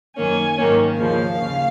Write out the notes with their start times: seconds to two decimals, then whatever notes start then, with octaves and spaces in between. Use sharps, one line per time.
0.17 F#2 D#3 A#3 C#4 G#5
0.57 G#2 D#3 F#3 A#3 C#4
0.97 D#2 C#3 F3 F5
1.39 D#2 C#3